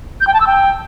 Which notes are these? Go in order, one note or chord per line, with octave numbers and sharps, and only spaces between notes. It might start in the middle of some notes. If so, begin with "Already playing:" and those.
G6
G5
A5
E6
G5